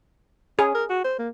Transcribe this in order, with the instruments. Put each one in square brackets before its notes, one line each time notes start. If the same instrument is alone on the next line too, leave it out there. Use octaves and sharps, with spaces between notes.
[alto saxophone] C#4 [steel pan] G#4
[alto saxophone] A#4
F#4
C5
A#3